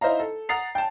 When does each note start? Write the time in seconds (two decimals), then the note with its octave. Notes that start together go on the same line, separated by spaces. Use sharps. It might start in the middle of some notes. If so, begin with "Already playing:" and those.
0.01 D#4 E4 C5 D#5 F5 A#5
0.20 A4
0.49 F#5 A#5 D#6 A6 C7 F7
0.75 G5 A5